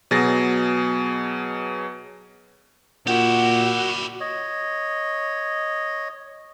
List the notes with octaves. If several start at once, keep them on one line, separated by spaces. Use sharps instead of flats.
B2 F#3 G#4 A6 A#6
A#2 E4 F#4 G4
C#5 D#5